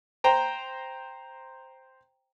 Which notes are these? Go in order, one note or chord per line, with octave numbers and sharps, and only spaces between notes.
C5 G5 A#5